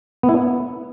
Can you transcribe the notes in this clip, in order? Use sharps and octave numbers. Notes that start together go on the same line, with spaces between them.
B3
E4
B3